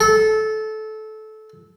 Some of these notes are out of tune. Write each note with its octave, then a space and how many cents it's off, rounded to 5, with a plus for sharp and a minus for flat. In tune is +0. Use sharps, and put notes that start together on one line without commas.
A4 -20